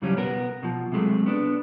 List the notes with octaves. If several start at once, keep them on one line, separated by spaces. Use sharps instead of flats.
E2 C#3 F#3 G3 C#4
B1 B3 A#4
B2 F3
C3 F#3 G#3 A3
B3 D4